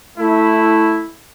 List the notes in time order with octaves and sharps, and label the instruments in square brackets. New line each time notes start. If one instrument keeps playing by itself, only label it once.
[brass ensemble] A3 E4